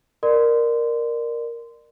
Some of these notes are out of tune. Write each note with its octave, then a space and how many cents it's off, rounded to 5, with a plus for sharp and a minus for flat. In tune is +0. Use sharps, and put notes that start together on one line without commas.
A#4 +0 D5 +30 C6 -20